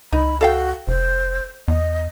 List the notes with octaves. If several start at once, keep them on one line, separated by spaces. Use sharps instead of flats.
C#2 D#4 B5
F#4 A4 F5 G5
F1 C5
E2 D#5